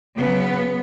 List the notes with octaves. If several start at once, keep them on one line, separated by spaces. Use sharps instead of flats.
C#3 F#3 B3